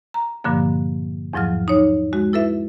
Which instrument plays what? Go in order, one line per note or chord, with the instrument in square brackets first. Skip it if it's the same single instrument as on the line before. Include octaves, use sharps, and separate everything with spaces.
[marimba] A#5
G2 A#2 D3 F3 A#3
E2 G#2 F3 F#3 F6
D#4 C#5
G#3 F#4
E4 A4 B4 E5